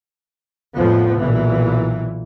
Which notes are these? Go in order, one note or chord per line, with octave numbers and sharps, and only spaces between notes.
F2 A2 F3 B3
B1 A#2 E3